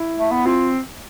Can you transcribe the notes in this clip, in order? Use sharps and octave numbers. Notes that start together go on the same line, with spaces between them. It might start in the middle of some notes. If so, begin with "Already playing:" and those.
Already playing: E4
A3
B3
C4 F4